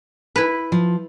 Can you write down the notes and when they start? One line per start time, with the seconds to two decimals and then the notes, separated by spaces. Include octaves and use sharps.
0.36 E4 B4
0.72 F3